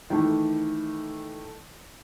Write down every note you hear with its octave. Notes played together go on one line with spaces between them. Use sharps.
D#3 E3 A3